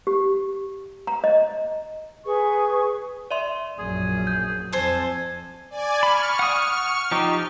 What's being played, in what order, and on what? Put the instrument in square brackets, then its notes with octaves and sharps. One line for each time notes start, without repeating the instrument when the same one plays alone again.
[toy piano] G4
A#5
D#5
[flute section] G#4 B4 C#6
[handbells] D5 E5 C6
[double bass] A#1 F#2 [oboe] G#4
[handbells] G6
[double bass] F2 [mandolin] A4 C5 [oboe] G#5
[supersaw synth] D5 G#5
[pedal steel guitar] B5 [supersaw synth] C#6 F6
[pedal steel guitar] F#5 D#6
F3 D#4 G4